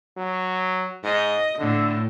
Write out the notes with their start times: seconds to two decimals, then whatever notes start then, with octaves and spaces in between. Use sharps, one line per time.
0.17 F#3
1.04 G#2 D#5
1.59 A2 D3